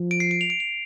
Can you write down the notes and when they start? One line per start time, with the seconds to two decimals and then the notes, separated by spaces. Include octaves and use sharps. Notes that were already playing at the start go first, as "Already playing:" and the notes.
Already playing: F3
0.11 D7
0.20 C7
0.31 D7
0.41 F7
0.50 D7
0.60 F7